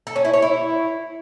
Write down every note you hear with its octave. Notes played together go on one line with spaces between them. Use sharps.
A4
C#4
E4
C#5
E4